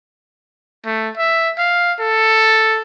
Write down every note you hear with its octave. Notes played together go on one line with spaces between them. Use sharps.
A3
E5
F5
A4